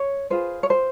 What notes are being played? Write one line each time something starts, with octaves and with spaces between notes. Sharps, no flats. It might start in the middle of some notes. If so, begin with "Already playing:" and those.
Already playing: C#5
F4 G#4 B4 C5
C#5
C5